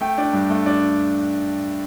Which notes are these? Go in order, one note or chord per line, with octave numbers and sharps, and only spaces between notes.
A3 G5
D4
G2
A3
D4